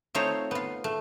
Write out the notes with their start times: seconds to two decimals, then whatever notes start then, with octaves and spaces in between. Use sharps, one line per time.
0.15 A3 C4 D#4 F4 C5 C#5
0.51 B3 F4
0.84 A3